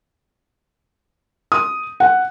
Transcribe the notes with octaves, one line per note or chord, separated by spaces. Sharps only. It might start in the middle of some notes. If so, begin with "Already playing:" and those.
D#6
F#5